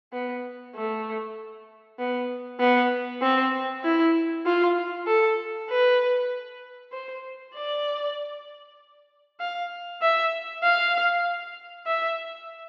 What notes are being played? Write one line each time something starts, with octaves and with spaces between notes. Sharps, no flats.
B3
A3
B3
B3
C4
E4
F4
A4
B4
C5
D5
F5
E5
F5
E5